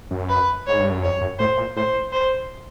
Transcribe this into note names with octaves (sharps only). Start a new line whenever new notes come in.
F#2
B4
G#2 C#5
G2
F#2
F2 C#5
F#2
A2 C5
A#2
A2 C5
C5